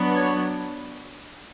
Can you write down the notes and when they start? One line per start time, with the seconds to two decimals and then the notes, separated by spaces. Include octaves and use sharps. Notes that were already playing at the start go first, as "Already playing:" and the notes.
Already playing: F#3 B3 D4
0.15 C#5